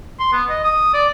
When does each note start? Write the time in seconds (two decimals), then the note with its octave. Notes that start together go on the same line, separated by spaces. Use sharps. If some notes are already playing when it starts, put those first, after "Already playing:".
0.20 C6
0.32 B3
0.49 D#5
0.64 D#6
0.94 D5